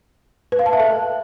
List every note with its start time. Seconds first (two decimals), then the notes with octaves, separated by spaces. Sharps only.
0.52 B4
0.59 F5
0.66 A5
0.73 E5
0.80 A4